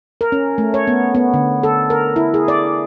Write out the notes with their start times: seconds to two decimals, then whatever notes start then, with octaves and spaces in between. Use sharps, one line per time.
0.21 A#4
0.32 C#4
0.58 A3
0.74 C#5
0.88 B3
1.15 B3
1.34 D3
1.63 A4
1.90 A#4
2.16 E4
2.34 G#4
2.48 D5